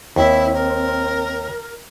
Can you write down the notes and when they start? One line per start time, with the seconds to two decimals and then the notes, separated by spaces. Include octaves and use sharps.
0.16 D#2 C4 E4
0.54 A#4